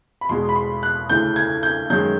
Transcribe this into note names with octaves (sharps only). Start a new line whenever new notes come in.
B5
E2 B2 G#3 C6
B5
C6
F#6
D2 C#3 E3 A3 G6
G#6
G6
F#2 D#3 G#3 G6